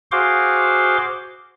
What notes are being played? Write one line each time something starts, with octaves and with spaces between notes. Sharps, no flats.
F#4 G#4 C5 F5 C6 D6